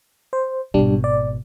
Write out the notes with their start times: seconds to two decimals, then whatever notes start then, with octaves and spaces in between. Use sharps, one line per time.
0.33 C5
0.74 G#1 B2 G3 D4
1.04 D5